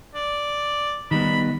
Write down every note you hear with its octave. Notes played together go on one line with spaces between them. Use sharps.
D5
D#3 G3 B3 B5